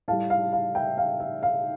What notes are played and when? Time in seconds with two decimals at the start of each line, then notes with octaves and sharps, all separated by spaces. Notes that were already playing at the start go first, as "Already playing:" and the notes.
0.08 A2 G3 F5 A5
0.30 F5
0.53 F5
0.75 E5 G5
0.98 F5
1.20 E5
1.43 F5